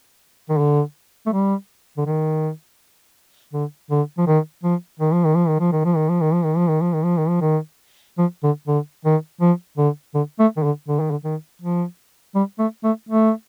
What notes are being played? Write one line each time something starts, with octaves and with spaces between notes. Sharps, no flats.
D#3
D3
A3
G3
D3
D#3
D3
D3
F3
D#3
F3
D#3
F3
D#3
F3
D#3
F3
D#3
F3
D#3
F3
D#3
F3
D#3
F3
D#3
F3
D#3
F3
D#3
F3
D#3
F3
D3
D3
D#3
F3
D3
D3
A3
D#3
D3
D3
D#3
D3
D#3
F3
G3
A3
A3
A3